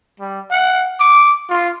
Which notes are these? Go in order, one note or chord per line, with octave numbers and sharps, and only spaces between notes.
G3
F#5
D6
F4